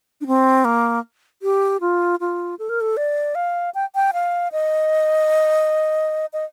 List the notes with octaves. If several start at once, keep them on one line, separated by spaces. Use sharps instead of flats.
D4
C4
A#3
G4
F4
F4
A4
A#4
A4
D5
F5
G5
G5
F5
D#5
D#5